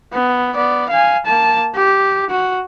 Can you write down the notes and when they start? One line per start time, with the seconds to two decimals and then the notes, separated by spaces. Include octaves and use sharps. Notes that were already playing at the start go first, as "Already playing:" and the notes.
0.13 B3
0.55 B3 D5
0.89 F5 G#5
1.26 A#3 A5
1.75 G4
2.30 F#4